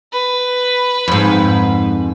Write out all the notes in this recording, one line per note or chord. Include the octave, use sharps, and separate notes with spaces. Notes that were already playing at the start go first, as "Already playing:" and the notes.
B4
F2 G#2